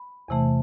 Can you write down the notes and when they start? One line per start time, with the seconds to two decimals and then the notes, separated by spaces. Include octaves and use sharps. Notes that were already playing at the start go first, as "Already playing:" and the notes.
Already playing: B5
0.28 E2 C3 E3 A3